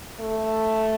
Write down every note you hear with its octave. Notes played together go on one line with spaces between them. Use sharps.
A3